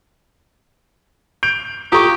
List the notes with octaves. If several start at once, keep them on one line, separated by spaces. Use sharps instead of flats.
G6 D7 F7
F4 G4 A4 A#5 C#6 D#6